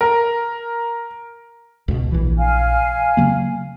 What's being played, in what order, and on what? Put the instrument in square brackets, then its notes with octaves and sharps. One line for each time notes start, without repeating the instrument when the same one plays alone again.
[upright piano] A#4
[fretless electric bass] C#2 B2
A#1 E3
[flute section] F5 G#5 F6
[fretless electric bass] C#3 F#3 A#3